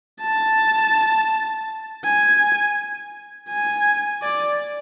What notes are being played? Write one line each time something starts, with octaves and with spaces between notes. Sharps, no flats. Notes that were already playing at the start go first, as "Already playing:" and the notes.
A5
G#5
G#5
D5